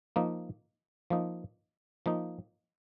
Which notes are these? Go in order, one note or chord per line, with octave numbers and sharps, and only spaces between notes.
F3 A#3 D#4
F3 A#3 D#4
F3 A#3 D#4